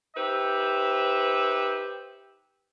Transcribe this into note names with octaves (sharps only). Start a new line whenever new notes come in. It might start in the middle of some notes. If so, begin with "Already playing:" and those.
D#4 G4 B4 C5 E5